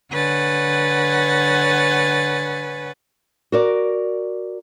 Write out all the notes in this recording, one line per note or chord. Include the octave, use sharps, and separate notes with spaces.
D3 B4 C#5 F#5 G#5 A6
F#4 A#4 D5